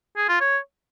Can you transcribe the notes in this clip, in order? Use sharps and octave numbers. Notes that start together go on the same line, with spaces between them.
G#4
F4
C#5